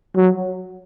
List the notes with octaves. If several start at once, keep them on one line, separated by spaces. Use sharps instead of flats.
F#3